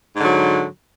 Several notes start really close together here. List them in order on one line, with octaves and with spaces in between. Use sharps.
G#2 D3 F#3